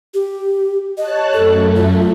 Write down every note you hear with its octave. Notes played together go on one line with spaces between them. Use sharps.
G4
C#5 D#5 A5 F#6
F#2 A3 A4
F4